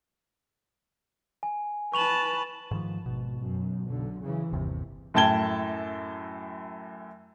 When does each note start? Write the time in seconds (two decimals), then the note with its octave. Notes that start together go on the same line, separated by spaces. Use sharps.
1.43 G#5
1.94 B4 A5 C#6 F7 F#7
2.71 G#2 D#3 F3
3.06 G#1 B2
3.40 F#2
3.89 B1 D3
4.22 C#3 E3
4.53 G1 D#2 C3
5.14 F#2 A2 G5 A5 G#6 G7